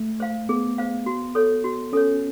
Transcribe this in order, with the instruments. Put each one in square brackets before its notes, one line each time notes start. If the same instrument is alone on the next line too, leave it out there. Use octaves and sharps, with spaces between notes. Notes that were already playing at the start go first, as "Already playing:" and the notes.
Already playing: [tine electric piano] A3
[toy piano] C5 F5
[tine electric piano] B3 [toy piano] G#4
[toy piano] C5 F5
F#4
A4 C#5
F#4
[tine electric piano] C#4 [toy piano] A4 C#5